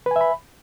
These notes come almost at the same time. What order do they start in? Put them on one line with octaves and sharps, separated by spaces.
B4 G#5 E5 B5